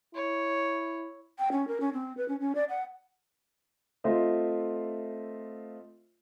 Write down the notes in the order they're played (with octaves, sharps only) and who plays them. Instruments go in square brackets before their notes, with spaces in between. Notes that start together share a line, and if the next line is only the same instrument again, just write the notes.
[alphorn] E4 [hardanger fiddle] C#5
[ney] G5
C#4
A#4
C#4
C4
B4
C#4
C#4
D5
F#5
[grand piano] A3 C4 F4 C5 D#5 E5